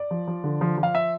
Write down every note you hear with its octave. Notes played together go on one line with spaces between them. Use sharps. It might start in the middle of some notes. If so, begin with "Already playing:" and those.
Already playing: D5
F3
F3
D3
F3
F3
F5
E5